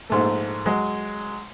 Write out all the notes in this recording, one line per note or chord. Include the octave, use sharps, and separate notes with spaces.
A#1 G#2 A3
F#3 G#3